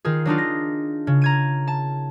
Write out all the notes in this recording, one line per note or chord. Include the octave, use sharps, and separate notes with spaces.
D#3 F4 G#4
F#3 D4 D#4 F4
A#6
C#3
A#5 G#6 D#7
A5